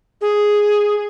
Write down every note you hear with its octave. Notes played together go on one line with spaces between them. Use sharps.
G#4